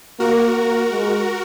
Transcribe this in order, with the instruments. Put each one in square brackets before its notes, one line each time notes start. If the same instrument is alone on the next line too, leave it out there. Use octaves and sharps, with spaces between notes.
[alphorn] A#3 [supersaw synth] F#4 A#4
[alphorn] A#3
G#3